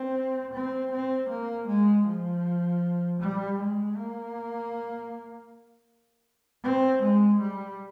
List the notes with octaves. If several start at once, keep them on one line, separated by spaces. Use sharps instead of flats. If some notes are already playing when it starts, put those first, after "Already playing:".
Already playing: C4
C4
C4
A#3
G#3
F3
G3
G#3
A#3
C4
G#3
G3